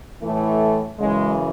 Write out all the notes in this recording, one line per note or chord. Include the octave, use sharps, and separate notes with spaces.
A2 E3 A3
F#2 C#3 E3 G#3